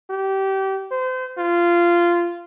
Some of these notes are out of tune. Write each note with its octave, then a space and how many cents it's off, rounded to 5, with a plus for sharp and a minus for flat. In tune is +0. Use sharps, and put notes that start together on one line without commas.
G4 -25
C5 -30
F4 -15